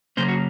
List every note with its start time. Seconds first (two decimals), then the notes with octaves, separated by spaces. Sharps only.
0.17 C#3 F#3 A#3 C#4 C5
0.28 F#4